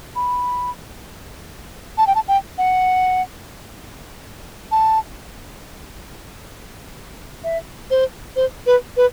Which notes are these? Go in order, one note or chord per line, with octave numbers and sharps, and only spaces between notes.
B5
A5
G5
A5
G5
F#5
A5
E5
C5
C5
B4
B4